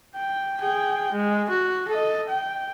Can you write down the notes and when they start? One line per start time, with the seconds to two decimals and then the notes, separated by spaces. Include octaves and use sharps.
0.16 G5
0.60 G#4 G5
1.12 G#3
1.50 F#4
1.88 A4 D#5
2.29 G5